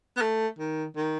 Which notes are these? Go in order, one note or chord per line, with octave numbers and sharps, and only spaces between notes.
B3
A3
D#3
D#3